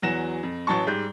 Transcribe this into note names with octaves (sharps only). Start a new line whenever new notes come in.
E2 E3 F#3 F#4 A#6 E7
F2
A1 E3 F#3 A5 C#6
G#2 G3 G6